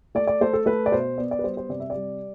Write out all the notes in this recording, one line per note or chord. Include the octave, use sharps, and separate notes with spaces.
A3 D5
D5
A3 C5
A4
A3 B4
D5
B2 C5
B3 D5
D5
B4
G3 C5
C5
C3 D5
E5
D5
G3